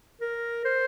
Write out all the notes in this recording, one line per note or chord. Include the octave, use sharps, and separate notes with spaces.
A#4
C5